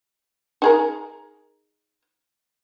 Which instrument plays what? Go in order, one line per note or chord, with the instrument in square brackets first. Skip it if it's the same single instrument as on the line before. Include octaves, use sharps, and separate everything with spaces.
[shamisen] D#4 G#4 A#4